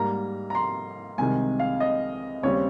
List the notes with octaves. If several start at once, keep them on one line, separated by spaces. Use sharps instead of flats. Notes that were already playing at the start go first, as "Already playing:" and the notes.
Already playing: G#2 G3 A#3 A#5
A#5
C6
C2 C3 D#3 G#3 G#5
F5
D#5
D#2 C#3 G3 C4 C#5